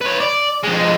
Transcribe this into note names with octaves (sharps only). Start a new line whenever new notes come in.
B4 C#5
D5
F2 G#3